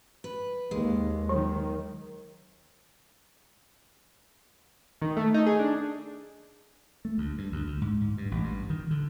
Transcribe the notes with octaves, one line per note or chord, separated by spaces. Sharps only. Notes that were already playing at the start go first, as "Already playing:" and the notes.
B4
D#2 G#3
D#3 F#3
D#3
A3
D#4
G#4
D4
A3
D2
G2
D2
D2
G#2
G#2
G2
A1
G2
D#3
D3